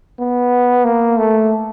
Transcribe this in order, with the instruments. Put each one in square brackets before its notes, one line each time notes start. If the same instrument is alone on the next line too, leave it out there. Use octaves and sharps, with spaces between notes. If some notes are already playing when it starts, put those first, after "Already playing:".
[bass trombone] B3
A#3
A3